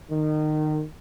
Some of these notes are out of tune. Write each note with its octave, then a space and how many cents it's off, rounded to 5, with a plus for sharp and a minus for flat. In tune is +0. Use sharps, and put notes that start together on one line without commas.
D#3 -25